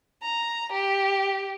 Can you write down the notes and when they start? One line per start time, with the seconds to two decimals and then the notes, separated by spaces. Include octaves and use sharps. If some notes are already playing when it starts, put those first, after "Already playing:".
0.22 A#5
0.73 G4